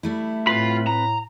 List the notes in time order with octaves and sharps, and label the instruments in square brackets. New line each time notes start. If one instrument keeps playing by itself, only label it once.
[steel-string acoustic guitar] G3 A3 E4
[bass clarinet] A2 [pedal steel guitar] C4 B4 B5 [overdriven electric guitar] F4
[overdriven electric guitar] A#5